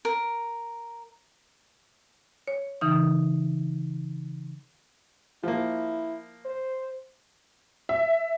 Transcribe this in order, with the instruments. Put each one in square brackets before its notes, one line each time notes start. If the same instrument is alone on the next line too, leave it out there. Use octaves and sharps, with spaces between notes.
[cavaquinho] A#4
[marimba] C#5
C#3 E3 D#4 D#6
[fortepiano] F3 A#3 [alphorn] E4
[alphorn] C5
[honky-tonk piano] E5